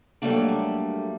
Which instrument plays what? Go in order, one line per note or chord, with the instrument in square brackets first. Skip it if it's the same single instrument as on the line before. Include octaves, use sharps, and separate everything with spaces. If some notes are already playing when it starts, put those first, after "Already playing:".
[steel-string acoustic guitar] F#3 G3 A3 A#3 D4